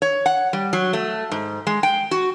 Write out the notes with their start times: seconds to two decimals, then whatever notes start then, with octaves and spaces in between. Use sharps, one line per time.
0.02 C#5
0.26 F#5
0.53 G3
0.73 F#3
0.93 A3
1.31 G#2
1.67 G#3
1.83 G5
2.11 F#4